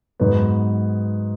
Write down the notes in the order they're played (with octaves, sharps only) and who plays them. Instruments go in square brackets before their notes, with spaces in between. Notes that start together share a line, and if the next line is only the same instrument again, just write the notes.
[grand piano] G#2 F#3 B3 D#4 F#4